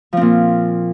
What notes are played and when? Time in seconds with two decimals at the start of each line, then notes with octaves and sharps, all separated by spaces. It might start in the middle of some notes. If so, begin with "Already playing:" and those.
0.13 F3
0.17 C4
0.21 A#2